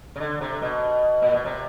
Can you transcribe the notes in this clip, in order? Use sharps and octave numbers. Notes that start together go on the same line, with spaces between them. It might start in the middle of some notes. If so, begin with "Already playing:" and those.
C#3
D3
C3
B2
A#2
B2
C3